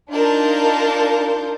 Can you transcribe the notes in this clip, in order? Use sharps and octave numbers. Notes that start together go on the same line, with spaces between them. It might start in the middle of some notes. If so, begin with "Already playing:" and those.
D4 D#4 F4 A#4 A5 G6